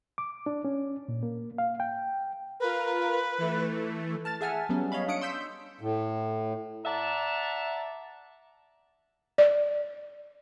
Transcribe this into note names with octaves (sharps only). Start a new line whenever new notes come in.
D6
D4
C#4
A#2
A#3
F5
G5
F4 A#4 B4
E3 A3
A5 F6 A6
G#4 E5 F#5 G#5 A5 F6
F#3 G3 B3 C#4
C#5 D#5 F5 B5
D4 D#6 C#7 D7
C6 E6 G6 B6
A2
D5 E5 F#5 A5 A#5
D5